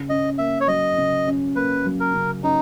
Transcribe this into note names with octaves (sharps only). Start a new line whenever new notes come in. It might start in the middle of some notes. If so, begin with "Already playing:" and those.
Already playing: C#3
C#4 D#5
A#3 E5
C#5
F#3 D#5
C#3
C#4
A#3 B4
F#3
A#4
C#3
C#4 D#4